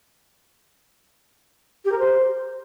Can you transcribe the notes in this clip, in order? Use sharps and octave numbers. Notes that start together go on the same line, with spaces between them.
G4
A#4
C5